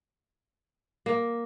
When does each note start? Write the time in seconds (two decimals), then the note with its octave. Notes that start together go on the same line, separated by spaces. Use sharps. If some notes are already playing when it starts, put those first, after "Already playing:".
1.06 A#3